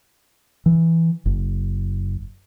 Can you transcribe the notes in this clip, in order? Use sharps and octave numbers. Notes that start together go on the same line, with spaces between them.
E3
F#1